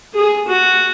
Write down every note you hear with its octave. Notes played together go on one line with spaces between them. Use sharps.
G#4
F#4